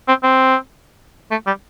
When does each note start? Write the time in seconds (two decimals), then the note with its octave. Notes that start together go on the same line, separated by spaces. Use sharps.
0.08 C4
0.23 C4
1.31 A3
1.47 G3